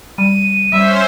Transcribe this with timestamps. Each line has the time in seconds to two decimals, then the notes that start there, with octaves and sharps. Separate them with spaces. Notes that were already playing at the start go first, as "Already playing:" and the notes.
0.18 G3 D#7
0.73 G3 C#4 C5 E5